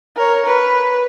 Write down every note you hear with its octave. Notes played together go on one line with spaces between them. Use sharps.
A#4 C#5
B4